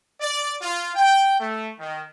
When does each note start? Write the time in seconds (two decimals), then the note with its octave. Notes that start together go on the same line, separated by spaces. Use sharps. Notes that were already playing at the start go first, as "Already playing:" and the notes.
0.20 D5
0.61 F4
0.95 G5
1.39 A3
1.79 D#3